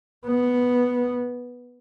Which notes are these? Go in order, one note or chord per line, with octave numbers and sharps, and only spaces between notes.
B3